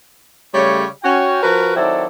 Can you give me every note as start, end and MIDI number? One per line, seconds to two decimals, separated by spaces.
0.54 0.85 49
0.54 0.85 55
0.54 0.85 57
0.54 0.85 73
1.04 1.41 61
1.04 1.41 66
1.04 1.41 79
1.43 1.76 53
1.43 1.76 66
1.43 1.76 70
1.43 1.76 71
1.76 2.05 51
1.76 2.05 54
1.76 2.05 60
1.76 2.05 64
1.76 2.05 69
1.76 2.05 74